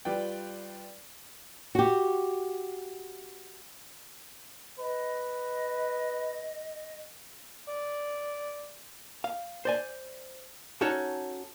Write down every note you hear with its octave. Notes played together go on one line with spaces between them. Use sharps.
G3 F4 B4 D5 G5
F#4 G4
B4 D#5
D5
F5
C5 D5 G#5
C#4 D#4 F#4 A4 C#5 A5